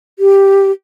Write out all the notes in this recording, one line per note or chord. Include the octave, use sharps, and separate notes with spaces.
G4